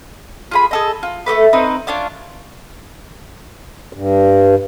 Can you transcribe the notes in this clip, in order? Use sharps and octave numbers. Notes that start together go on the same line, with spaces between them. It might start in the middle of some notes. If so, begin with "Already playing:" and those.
F4 G#4 B5
G#4 A4 D#5
F4
A3 G4 A4 B4
C4 D#4 B4
C#4 D4 F4 F5
G2